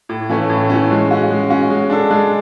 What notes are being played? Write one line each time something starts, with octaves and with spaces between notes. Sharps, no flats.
A2
E3 A3 C#4
A2
E3 A3 C#4
G#3
C#4 F#4
G#3
C#4 F#4
G#3
D4 A4
G#3